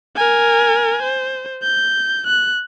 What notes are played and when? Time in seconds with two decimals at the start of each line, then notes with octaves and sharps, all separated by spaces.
0.16 A#4 G#5
1.03 C5
1.63 G6
2.27 F#6